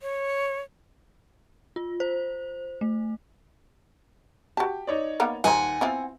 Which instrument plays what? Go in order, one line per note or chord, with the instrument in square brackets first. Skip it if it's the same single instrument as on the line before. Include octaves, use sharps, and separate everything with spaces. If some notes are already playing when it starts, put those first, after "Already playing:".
[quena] C#5
[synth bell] F4
C5
A3
[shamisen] F#4 A5 [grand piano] G4
[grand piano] D#4 C#5 D5
[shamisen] A#3 B3 F5
[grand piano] D#2 [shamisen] D#4 F4 C5 [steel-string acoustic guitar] F#5 G#5
[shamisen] B3 E4 F4 [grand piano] C4